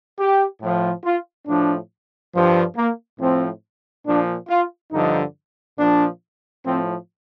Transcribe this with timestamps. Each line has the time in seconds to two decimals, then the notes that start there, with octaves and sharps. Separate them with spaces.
0.19 G4
0.61 A2 F3
1.05 F4
1.47 A2 F3 D4
2.35 G2 F3
2.77 A#3
3.21 A2 F3 C4
4.07 A#2 F3 D4
4.49 F4
4.92 G2 D3 F3 D#4
5.79 A#2 F3 D4
6.65 A2 F3 C4